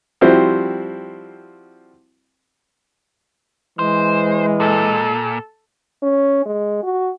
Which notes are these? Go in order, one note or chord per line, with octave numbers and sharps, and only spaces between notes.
F3 G3 C4 E4 F#4 C5
E3 G#3 C5
A#2 A4
C#4
G#3
F#4